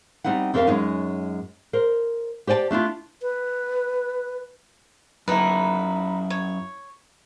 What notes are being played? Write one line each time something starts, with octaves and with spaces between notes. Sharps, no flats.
G3 C4 D#4 E4 F#5
F2 C4 D4 A#4 E5 F5
F#2 G#3 C#4 D#4
A#4 C5
G4 C5 D5 G5 A5
A3 D4 E4 F4
B4
F#2 D#4 E4 B4
C#5